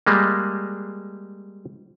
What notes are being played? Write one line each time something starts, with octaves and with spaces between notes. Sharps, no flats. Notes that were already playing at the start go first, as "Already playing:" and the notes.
G3 G#3 A#3